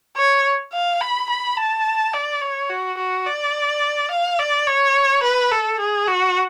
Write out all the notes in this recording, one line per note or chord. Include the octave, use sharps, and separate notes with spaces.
C#5
F5
B5
B5
A5
D5
C#5
F#4
F#4
D5
F5
D5
C#5
B4
A4
G#4
F#4